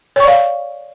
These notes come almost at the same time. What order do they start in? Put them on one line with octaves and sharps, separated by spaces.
C#5 C#6 D5 F5